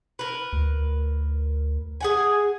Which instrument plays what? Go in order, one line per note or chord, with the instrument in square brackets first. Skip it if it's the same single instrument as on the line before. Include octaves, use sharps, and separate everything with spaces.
[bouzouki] A#4 B4
[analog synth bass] D2
[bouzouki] G#4 F#5 G#5